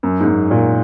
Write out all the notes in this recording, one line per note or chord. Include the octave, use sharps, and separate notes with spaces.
F#2
G#2
F#2
A#2